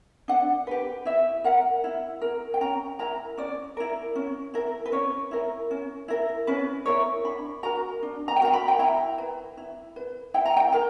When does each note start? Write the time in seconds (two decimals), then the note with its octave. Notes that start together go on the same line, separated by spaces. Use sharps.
0.28 D4 F#5
0.67 G4 B4
1.05 E4 E5
1.44 A#4 F#5
1.84 E4
2.21 A#4
2.54 G5
2.61 C#4 A#5
2.99 E4 A#4 A#5
3.37 C#4 D5
3.77 E4 A#4
4.15 C#4
4.54 E4 A#4
4.86 B4
4.92 C#4 C#5
5.31 E4 A#4
5.71 C#4
6.08 E4 A#4
6.47 C#4 B4
6.86 E4 A#4 C#5
7.25 D4 B5
7.63 F#4 A#4 A#5
8.03 D4
8.28 A#5
8.36 G5
8.41 F#4 A#4 A#5
8.53 B5
8.68 G5
8.79 E4 A#5
9.18 B4
9.57 E4
9.96 B4
10.34 E4 G5
10.46 A#5
10.56 G5
10.73 A#4 A#5